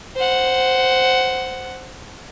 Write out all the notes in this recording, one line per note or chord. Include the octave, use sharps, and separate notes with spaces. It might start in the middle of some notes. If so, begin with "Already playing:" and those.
C5 F#5